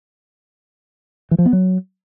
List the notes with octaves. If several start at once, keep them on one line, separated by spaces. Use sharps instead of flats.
E3
F3
B3
F#3